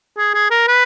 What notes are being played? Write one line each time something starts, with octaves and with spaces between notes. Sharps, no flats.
G#4
G#4
A#4
B4